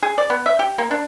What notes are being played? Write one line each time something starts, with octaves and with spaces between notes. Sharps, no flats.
G#4
D5
B3
E5
G4
A#3
D4